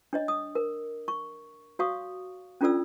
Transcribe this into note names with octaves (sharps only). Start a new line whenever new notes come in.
D4 C#5 D#5
D#6
A#4
C#6
F#4 C#5 F5 C#6 D#6
C#4 D4 F4 A4 D5 E6